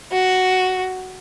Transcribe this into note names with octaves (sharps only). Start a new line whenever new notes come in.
F#4